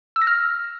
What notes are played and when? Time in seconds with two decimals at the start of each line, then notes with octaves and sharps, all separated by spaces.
0.16 E6
0.22 A#6
0.27 F6